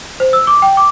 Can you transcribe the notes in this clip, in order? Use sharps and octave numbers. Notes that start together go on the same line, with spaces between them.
C5
E6
D6
G5
D6